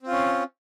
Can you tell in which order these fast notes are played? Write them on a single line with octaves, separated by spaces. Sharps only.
C4 F4 C#4